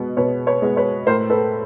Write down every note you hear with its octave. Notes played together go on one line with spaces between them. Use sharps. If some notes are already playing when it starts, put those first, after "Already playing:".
Already playing: B2 G#3 B3
B2 B4 C#5
B4 C#5
G#3 B3
B4 C#5
A2 A#4 C5
A4 B4